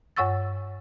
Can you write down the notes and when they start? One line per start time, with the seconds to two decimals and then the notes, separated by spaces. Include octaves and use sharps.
0.16 G2 C#5 F#5 C#6 E6 A6